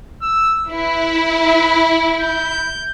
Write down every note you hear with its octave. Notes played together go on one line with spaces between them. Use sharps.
E6
E4 B4
G6